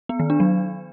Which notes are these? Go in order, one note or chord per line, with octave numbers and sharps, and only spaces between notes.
B3
D#3
D4
F#3